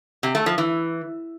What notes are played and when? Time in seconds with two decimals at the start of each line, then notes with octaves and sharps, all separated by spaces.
0.23 C3
0.35 A3
0.46 F3
0.58 E3